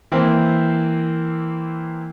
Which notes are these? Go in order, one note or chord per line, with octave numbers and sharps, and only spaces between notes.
E3 A#3 C4 E4 A#4 C5